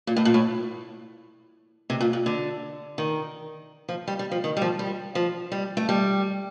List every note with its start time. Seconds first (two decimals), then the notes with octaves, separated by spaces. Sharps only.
0.07 A#2
0.16 A2
0.25 A#2
0.34 A2
1.90 C3
2.01 A#2
2.13 A#2
2.26 D3
2.98 D#3
3.89 F3
4.08 G3
4.19 G3
4.31 F3
4.44 D#3
4.57 G3
4.61 F3
4.79 G3
5.15 F3
5.52 G3
5.77 A3
5.89 G3